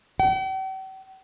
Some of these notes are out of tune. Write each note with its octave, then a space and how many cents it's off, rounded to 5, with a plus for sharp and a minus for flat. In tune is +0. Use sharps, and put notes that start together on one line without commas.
G5 -45